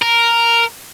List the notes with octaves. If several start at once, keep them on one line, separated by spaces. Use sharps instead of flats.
A#4